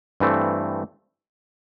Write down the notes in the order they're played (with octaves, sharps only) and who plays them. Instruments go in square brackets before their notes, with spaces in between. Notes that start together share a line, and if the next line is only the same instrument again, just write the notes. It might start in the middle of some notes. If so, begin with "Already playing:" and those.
[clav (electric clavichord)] G2 E3 A3 C4